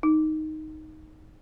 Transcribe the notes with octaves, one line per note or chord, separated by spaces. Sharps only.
D#4